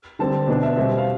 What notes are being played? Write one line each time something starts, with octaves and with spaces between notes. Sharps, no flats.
D3 G3 C4 A5
B2 B3 D4
E5
B2 G3 C4 E5
F5